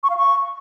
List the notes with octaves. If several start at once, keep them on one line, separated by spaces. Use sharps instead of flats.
C#6
F5
C#6